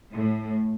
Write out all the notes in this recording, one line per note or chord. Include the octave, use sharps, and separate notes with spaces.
A2